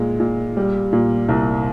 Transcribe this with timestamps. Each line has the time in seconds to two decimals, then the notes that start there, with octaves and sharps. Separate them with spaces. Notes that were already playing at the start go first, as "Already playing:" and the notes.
Already playing: A#2 G#3
0.20 A#2
0.57 G3
0.93 A#2
1.29 C2